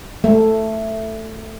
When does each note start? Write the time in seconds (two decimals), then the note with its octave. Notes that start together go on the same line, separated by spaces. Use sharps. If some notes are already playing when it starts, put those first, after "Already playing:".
0.24 A3